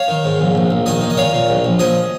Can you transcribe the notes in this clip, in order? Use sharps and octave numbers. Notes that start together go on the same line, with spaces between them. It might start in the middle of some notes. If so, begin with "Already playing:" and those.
Already playing: C#5 F5
D#3
G#2
A#1
A#1
A#1
D#3 D#5 G#5
D#3
D#5
A#2 C#5 F5
A#2
A#1
A#1
F3 D#5 G#5